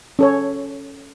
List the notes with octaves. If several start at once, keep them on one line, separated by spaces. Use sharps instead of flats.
C#4 A4 C#5